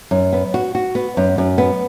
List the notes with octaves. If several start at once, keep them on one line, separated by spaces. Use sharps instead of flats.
F#2
B3
F#4
F#4
B3
F#2
F#2
B3